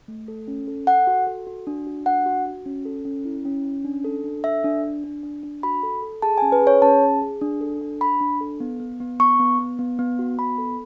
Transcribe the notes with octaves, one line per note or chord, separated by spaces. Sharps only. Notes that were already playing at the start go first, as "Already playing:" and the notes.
A3
A4
C#4
A4
A4 F#5
F#4
A4
F#4
D4
F#4
D4 F#5
F#4
F#4
C#4
A4
C#4
E4
C#4
C#4
D4
A4
D4
A4 E5
D4
D4
D4
D4
D4
F#4 B5
A4
A4
G#4 A5
G#5
C#4
B4
G#4
C#5
C#4 A5
G#4
G#4
D4
A4
D4
D4 B5
D4
A4
B3
B3
B3
B3 C#6
B3
B3
B3
B3
F#4
B3 B5
A4